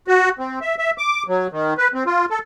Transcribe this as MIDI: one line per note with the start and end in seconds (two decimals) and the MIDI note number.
0.08 0.29 66
0.39 0.59 60
0.62 0.75 76
0.78 0.91 76
0.98 1.23 86
1.28 1.47 54
1.52 1.74 51
1.78 1.88 71
1.94 2.04 60
2.06 2.25 65
2.30 2.39 69